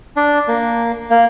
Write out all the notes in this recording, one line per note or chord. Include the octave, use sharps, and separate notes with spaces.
D4
A#3
A#3